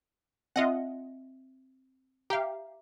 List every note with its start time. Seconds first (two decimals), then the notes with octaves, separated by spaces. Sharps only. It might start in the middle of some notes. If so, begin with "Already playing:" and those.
0.56 C4 F4 D#5 E5 F#5
2.30 G4 E5 F5 A#5